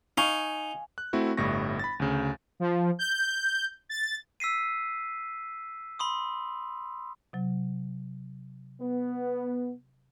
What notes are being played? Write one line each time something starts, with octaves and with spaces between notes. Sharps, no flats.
D#4 F5 G#5 C#6
F#6
A3 C4 E4 F#4
G1 A2 G3 E4 C#6 A#6
B5 A6
D2 C#3
F3
G6
A6
E6 B6 C7 D#7
B5 C6 D#6
C3 F#3
B3